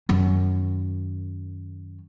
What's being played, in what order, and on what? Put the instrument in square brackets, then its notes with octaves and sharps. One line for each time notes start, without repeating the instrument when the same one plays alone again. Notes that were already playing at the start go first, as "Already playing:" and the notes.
[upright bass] F#2 D#3